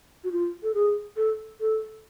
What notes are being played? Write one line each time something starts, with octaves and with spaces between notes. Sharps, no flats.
F#4
F4
A4
G#4
A4
A4